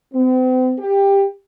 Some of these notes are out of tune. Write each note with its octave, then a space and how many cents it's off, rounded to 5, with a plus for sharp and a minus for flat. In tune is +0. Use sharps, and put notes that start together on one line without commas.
C4 -40
G4 +15